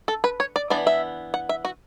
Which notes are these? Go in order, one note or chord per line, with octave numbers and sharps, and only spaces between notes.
A4
B4
C#5
D5
E3 B3 D4 D5
E5
F#5
E5
F#4